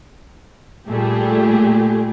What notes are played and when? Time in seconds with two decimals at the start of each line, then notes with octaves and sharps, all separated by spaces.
0.88 A#2 G3 A3 G4 G#4